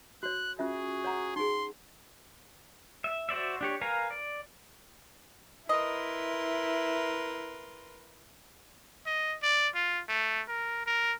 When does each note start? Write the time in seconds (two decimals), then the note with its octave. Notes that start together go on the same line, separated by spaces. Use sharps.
0.23 F#4 C#5 F#6
0.59 C#4 F4 F#4 G#4 E5
1.04 C#5 F#5 A#5
1.36 D#4 G#4 C6
3.04 E5
3.29 F#4 C5 D5 E5
3.61 D4 G4 C#5
3.81 A#4 B4 F5 G#5 A#5
4.10 D5
5.69 E4 A#4 B4 D#5 C6
9.06 D#5
9.42 D5
9.75 F4
10.09 A3
10.48 A#4
10.86 A#4